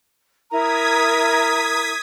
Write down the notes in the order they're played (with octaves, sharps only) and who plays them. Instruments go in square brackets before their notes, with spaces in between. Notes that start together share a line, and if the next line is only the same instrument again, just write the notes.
[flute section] E4 A#4 A#5 [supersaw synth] D#6 G#6 B6